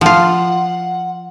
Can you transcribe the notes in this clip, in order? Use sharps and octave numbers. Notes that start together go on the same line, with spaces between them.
F3 F4 F#5